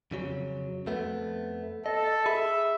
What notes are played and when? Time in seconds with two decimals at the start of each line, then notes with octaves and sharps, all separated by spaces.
0.11 F2 C#3 F#3
0.86 F2 A3 B3
1.86 A4 D#5
2.26 G#4 E5 B5